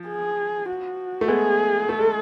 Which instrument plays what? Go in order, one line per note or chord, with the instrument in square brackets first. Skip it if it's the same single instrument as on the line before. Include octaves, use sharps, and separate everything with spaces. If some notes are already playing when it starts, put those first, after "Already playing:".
Already playing: [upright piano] F3
[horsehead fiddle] G#4
F#4
[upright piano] A3
[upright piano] G#3 B3 [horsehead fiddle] G#4
[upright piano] A3 [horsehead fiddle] A4
[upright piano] G#3